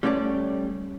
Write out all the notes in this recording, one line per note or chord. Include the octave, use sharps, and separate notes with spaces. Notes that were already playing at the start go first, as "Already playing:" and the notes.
G3 A3 C#4 C#5 D5